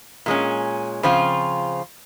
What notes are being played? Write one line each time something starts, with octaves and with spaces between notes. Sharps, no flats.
A#2 G#3 C#4
C#3 F3 C4 F4